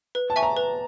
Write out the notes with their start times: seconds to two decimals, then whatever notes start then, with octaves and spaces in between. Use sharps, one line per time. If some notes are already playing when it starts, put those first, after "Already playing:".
0.15 B4
0.30 A5
0.36 E5 G#5 C#6
0.43 A#5
0.57 B4